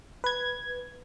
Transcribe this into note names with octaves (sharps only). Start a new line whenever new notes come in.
B4 G#6